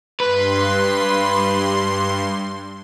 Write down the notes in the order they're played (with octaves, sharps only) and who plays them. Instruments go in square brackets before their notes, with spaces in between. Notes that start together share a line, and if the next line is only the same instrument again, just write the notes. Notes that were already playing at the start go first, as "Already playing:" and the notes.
[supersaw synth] G2 C6 [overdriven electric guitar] B4